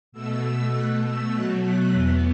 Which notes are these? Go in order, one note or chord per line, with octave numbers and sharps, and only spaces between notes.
B2 A3 E6
B2 A3 F#6
E6
B2 F#3 A3 F#6
F#6
E2 E3 B3 F#6